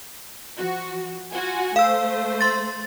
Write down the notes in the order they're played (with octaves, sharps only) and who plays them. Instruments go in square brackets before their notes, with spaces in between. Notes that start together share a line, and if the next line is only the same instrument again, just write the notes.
[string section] F3 F#4
F4 F#4 G#5
[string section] A3 C5 [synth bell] F5 E6
[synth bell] C6 A6